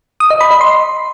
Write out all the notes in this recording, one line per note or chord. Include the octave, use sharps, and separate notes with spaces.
D#6
D#5
B5
D#5
C6